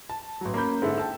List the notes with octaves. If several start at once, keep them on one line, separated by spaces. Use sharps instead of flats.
A5
A1 F#3
A#3 C#4 B5 G6
G#2 D3 E4 A4
G5 A5 E6